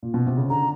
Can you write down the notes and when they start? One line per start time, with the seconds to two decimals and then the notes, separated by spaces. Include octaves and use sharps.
0.03 A#2
0.14 B2
0.26 C3
0.37 C#3
0.50 D3 A#5